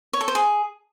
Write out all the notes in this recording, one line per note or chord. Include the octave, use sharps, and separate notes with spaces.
C#5
A4
C5
G#4